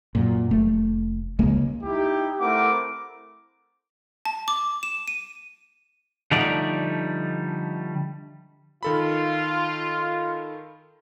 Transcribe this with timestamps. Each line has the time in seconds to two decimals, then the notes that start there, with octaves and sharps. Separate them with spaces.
0.15 F#2 A#2
0.51 F1 A3
1.39 C#2 G#3 A#3
1.83 D#4 E4 G4
2.40 A3 C4 E4 A#4 F#5 D6
4.25 A5
4.48 D6
4.83 E7
5.08 D#7
6.31 D3 F3 G3 A3 D#4 D5
8.83 D#3 F4 A4 B5